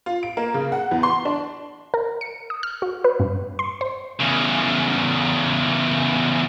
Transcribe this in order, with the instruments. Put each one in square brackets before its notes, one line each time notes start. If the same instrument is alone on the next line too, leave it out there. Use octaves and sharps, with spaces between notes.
[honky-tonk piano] F4
D7
A#3
C#3
F#5
E2
C6
D4
[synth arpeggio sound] A#4
C#7
D#6
F6
F#4
B4
G2
C6
C5
[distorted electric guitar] E2 C#3